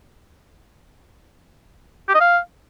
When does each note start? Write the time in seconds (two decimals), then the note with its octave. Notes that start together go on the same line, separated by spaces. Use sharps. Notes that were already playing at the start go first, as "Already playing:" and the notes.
2.08 G4
2.15 D#5
2.21 F5